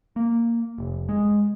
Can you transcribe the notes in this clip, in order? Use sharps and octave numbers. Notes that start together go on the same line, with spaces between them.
A#3
F1
G#3